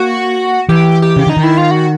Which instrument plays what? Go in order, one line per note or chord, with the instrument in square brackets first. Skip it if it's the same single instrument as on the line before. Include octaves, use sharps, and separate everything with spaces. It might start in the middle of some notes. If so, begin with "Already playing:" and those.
Already playing: [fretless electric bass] A#3 [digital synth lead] F#4
[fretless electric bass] E3 [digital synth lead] G4
[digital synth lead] G4
[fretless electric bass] C#3
[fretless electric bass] D3 [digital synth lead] D#4
[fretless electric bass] D#3
[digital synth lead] E4
F4
F#4